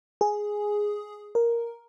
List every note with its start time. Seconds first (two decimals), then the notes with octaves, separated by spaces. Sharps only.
0.21 G#4
1.35 A#4